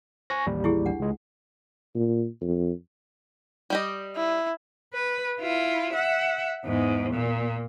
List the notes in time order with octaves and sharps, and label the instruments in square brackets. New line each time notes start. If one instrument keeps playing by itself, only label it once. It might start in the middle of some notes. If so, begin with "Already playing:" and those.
[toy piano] C5 [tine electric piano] G#5 C#6 A#6
[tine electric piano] A1 D#2 G3
[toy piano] E4 G4 G#4
D4 F#5
[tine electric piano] C#2 G#3
[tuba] A#2
F2
[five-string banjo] G3 G4 D#5
[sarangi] E4
[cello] B4
E4 F4
E5 F#5
E2 G#2
A#2